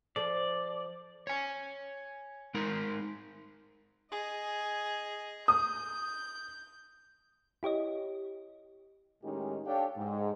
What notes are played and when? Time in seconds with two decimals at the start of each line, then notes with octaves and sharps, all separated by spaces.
0.16 F3 A4 D5
1.27 C#5 G#5
2.54 G#3 D#4 A#4
4.11 G#4 D#5
5.48 D#6 G6
7.63 E4 G4 C#5 D#5
9.23 A2 D#3 G#3 C#4 D#4 G4
9.65 D4 G4 A4 C#5 F5 G5
9.97 G#2